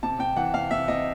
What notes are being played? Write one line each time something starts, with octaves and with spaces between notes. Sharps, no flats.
C3 A5
C3 G5
E3 F#5
C3 F5
C3 E5
C3 D#5